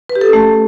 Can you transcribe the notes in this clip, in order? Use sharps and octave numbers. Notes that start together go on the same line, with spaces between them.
B4
G4
A4
C#4
A3